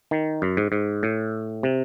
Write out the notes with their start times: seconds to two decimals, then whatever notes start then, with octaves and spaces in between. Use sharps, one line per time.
0.11 D#3
0.42 F#2
0.57 G#2
0.72 G#2
1.03 A2
1.63 C3